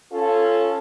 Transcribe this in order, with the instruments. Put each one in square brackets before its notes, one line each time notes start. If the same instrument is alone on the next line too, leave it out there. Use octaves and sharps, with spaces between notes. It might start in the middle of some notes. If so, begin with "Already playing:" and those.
[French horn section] C#4 F4 A4